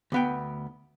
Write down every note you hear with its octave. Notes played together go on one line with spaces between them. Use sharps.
D2 B3 G5